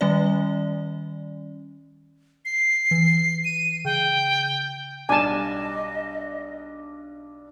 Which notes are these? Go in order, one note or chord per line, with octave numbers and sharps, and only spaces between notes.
D#3 G3 C#4 D5
C7
E3
D#7
C#3 G5
B1 G3 D4 D#5 G#5 A5